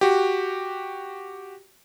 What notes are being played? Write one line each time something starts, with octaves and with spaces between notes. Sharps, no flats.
F#4 G4